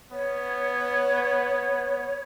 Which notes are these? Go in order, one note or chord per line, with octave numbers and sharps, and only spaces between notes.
B3 C#5